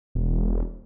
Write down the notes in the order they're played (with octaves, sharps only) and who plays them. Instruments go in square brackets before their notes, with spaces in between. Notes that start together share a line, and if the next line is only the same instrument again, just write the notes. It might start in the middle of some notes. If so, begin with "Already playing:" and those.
[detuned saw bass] E1